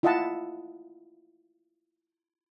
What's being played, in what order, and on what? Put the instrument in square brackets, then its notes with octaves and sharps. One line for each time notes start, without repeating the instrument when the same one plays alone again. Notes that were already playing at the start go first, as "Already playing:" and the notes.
[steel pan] E4 F4 D#5 E5 F#5 A5